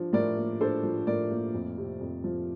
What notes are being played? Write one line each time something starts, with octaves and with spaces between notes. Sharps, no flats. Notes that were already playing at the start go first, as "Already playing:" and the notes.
Already playing: F3 D4
A2 A#4 D5
A#3
D4 A4 C5
F3
A2 A#4 D5
A#3
F2
C3
F2
F3